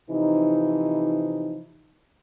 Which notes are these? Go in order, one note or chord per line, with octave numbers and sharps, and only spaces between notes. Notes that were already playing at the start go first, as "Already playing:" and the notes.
C3 E3 F3 D#4